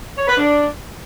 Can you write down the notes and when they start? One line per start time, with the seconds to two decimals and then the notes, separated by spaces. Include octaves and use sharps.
0.17 C#5
0.27 B4
0.37 D4